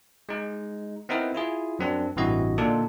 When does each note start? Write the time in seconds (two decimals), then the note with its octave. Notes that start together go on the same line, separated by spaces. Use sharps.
0.29 G#3 D#4
1.09 B3 C4 D#4 E4 A#4 B4
1.35 E4 F4 G#4
1.79 F#2 C4 D4
2.16 A1 G2 C3 E3 F#4 D#5
2.58 A#2 D3 D4 D#4 F4 A4